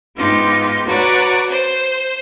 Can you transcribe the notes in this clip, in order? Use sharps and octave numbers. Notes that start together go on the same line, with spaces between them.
G#2 B3 D#4 F4 G4
F#4 B4 C#5 D5 F#5 A#5
C5 G6